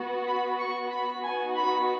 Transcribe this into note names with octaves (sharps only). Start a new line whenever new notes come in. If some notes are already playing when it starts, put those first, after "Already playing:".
Already playing: B3 F#4
B5
C#6
B5
B3 D#4 F#4 G#5
B5